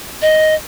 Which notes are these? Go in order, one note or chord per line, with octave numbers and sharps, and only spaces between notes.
D#5